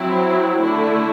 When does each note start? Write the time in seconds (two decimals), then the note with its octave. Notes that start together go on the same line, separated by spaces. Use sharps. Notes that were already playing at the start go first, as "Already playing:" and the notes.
Already playing: F#3 C4 E4
0.59 D3 A3 E4